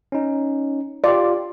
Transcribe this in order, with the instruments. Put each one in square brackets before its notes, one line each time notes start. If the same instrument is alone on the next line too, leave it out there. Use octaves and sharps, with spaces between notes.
[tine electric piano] C#4 D#4
[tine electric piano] F4 G4 [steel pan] D5